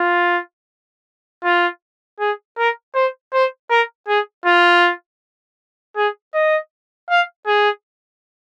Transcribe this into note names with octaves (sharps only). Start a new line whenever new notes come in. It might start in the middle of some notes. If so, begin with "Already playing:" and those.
Already playing: F4
F4
G#4
A#4
C5
C5
A#4
G#4
F4
G#4
D#5
F5
G#4